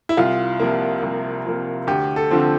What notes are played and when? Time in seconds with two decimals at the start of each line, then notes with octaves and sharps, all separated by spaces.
0.09 E4
0.17 C2 F4
0.60 C3 F3 A#3
1.03 C2
1.45 C3 F3 A#3
1.87 D2 G4
2.16 A4
2.31 D3 F3 C4